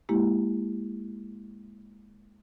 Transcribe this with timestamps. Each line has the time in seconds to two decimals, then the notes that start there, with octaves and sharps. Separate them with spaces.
0.09 G#3 A#3 E4 G4